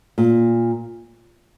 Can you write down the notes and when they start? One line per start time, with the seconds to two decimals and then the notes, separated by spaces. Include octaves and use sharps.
0.18 A#2